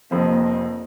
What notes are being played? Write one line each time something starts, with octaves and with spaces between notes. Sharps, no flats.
F1 F2 F3 A#3 C4